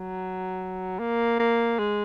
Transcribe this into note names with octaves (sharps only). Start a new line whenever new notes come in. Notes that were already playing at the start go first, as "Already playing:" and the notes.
Already playing: F#3
A#3
A#3
G#3